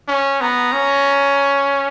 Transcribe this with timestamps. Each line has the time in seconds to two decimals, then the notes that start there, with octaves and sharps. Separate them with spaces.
0.08 C#4
0.41 B3 A#5
0.73 C#4